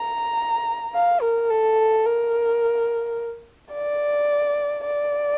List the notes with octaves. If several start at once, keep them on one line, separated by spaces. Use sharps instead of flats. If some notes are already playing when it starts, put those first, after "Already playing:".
Already playing: A#5
F5
A#4
A4
A#4
D5
D5